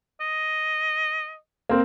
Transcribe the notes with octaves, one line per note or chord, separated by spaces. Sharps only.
D#5
A#3 C4 A#4